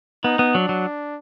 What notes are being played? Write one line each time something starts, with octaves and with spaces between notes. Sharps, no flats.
B3 D#4
B3
F#3 D4
F#3